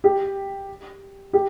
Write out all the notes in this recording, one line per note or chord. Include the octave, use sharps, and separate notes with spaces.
G4
G4